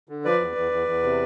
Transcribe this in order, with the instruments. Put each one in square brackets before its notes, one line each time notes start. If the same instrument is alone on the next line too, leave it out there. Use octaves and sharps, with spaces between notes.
[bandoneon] D3
F3 B4 D5
E2
E2
E2
E2
C3